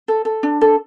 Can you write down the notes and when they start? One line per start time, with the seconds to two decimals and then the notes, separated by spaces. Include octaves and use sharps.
0.08 A4
0.25 A4
0.43 D4
0.61 A4